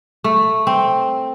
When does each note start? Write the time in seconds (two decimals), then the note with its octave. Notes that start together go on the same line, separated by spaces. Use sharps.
0.24 A3
0.67 C4